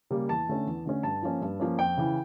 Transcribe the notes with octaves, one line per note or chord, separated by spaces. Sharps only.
C#3 G3 A#3
E2 A5
D3 A3 C#4
E2
D3 A3 C#4
G2 A5
F3 A#3 C#4
G2
F3 A#3 C#4
F2 G5
C#3 E3